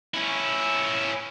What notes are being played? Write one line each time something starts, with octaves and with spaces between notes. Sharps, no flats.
C#4 E4